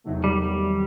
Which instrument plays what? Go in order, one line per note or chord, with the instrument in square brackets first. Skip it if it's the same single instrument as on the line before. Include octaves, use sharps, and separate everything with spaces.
[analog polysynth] E2 C3 D#3 F#3 A3
[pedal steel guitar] G3
G3